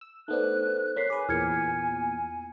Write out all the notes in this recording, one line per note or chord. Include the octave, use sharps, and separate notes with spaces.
E6
A3 B3 D4 D#4 A4 C5 F#6
A#3 C4 C#5 B6 C7
G#4 B4 G#5 D6
E2 A#2 F6 G#6 C#7